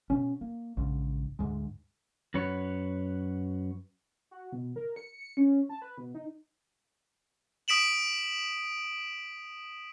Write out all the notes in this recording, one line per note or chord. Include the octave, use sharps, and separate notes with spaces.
B2 C#4
A#3
A#1 G#2 C#3
D2 G#2 G#3
F#2 F#4 B4 C#5
F#4
B2
A#4
C#7
C#7
C#4
A5
B4
B2
D#4
D#6 B6 D7 E7 F#7